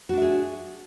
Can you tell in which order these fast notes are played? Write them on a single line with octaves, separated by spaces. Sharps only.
F#4 D4 E5 G#4